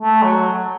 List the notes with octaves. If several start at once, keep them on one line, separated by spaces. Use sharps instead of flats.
A3
F#3